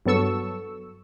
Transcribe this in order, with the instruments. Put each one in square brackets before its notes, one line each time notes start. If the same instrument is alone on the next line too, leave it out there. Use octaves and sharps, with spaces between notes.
[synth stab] G2 F#3 B3 A4 C#6 E6